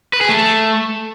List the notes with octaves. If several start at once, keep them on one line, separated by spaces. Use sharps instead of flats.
B4
G#4
A3